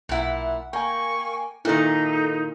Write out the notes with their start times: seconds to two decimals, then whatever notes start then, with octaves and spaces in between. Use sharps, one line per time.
0.09 B1 A#2 E4 F#5
0.73 A#3 G5 G#5 C#6
1.65 A#2 D#3 D#4 E4 A4